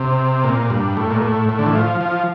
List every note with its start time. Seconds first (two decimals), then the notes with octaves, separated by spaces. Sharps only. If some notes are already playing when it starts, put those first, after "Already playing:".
Already playing: C3
0.44 A#2
0.70 G2
0.97 A2
1.11 A#2
1.22 A2
1.49 A2
1.59 D3
1.66 E3
1.75 F3
2.01 F3